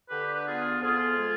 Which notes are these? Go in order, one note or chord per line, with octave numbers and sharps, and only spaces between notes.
D3 G4 B4
B4
B3 F4 G#4
F2 F4 G#4
G#3